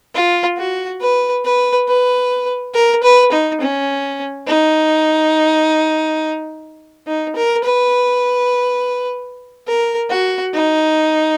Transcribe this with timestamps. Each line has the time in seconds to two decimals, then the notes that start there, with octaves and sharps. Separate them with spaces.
0.14 F4
0.58 F#4
1.01 B4
1.45 B4
1.88 B4
2.74 A#4
3.03 B4
3.32 D#4
3.61 C#4
4.47 D#4
7.07 D#4
7.36 A#4
7.65 B4
9.67 A#4
10.10 F#4
10.54 D#4